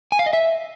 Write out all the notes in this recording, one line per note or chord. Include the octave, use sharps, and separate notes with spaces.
G#5
F5
D#5
E5